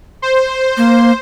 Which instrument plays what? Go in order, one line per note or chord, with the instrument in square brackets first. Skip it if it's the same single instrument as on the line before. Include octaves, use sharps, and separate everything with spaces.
[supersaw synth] C5
[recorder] A#3